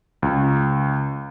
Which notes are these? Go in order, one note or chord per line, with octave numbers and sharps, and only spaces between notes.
C#2